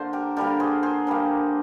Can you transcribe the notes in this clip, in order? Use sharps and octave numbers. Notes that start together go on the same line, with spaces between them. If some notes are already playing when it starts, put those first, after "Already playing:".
Already playing: D3 A#3 C5
G4 A#4
D3 G3 A#3 G4 A#4
G#4 C5
G#4 C5
D3 G3 A#3